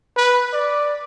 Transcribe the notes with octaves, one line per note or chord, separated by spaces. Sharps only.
B4
D5